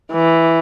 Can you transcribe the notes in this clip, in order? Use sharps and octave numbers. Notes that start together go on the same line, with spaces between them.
E3